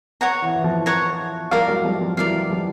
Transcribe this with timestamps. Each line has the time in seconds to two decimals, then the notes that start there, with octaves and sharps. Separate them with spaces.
0.21 C#5 F#5 A#5
0.42 E3
0.56 E3
0.64 F3
0.86 C#5 F#5 A#5
1.51 F3 G3 A#4 D5 F5
1.68 F#3 G#3
1.84 F3 G3
2.01 F3
2.17 E3 F#3 A#4 D5 F5
2.50 F3 G3